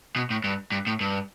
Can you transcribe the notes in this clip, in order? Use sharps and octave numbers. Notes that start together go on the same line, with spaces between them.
B2
A2
G2
G2
A2
G2